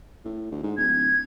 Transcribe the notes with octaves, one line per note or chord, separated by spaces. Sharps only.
A2
D2
G#2
D1 G#6